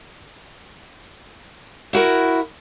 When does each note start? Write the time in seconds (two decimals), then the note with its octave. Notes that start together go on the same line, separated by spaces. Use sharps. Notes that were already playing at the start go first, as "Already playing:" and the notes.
1.93 E4 F#4 A#4